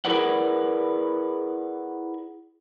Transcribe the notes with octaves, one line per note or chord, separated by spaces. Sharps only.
E4 G#4 A#4 B4 D5 F#5